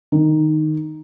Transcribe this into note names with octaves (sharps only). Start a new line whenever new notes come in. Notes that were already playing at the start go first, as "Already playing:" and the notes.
D#3